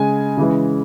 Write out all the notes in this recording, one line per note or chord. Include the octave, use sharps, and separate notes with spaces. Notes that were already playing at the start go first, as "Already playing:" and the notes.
Already playing: C#3 G#3 G#5
C#3 E3 G#3